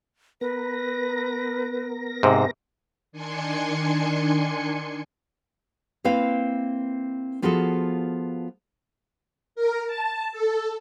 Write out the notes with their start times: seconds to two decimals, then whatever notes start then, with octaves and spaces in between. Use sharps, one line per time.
0.41 B3 A#4 B4 A#6
2.23 G#2 C3 C5
3.12 D#3 D4 G#5 C6 C#7
6.04 A#3 C4 E4 B4 F5
7.42 F3 B3 F4 F#4 G#4 A4
9.55 A#4
9.87 A5
10.32 A4